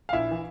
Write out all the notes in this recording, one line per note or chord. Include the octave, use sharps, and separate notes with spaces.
F5
A#1 E4 E5
E3